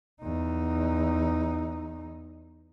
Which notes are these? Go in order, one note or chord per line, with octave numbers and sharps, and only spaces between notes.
E2 D#4